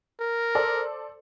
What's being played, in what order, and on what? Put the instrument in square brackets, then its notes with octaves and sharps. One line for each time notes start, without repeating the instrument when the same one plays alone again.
[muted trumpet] A#4
[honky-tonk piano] A4 C5 D5